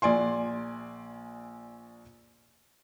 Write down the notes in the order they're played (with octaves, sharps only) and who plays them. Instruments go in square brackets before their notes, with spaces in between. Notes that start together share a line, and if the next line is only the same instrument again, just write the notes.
[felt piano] A#1 D5 G#5 C6